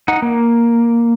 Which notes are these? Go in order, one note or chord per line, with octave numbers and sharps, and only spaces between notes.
D#4 F#5
A#3